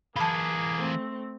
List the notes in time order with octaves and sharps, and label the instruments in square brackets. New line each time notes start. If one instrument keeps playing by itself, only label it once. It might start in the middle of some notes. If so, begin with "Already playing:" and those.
[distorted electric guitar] E3 F4 [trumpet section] A#3 G#4 [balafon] A5 B5
[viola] A3 C4